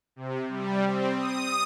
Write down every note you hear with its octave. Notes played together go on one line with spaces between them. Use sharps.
C3
G3
C4
D#6